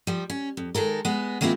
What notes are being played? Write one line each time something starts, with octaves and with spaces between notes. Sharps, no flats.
F3 G3
C#4
F2
D#3 G#3 A4 A#4
G#3 B3
D#3 G#3 A#3 C4 E4 F4